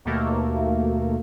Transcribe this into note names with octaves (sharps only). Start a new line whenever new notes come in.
D#2 B2 A3 A#3